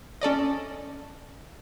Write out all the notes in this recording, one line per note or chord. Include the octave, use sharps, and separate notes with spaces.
C#4 A4 D5 D#5